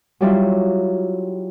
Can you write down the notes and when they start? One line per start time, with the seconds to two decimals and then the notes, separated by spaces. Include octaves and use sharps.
0.21 F#3 G3 E4 F4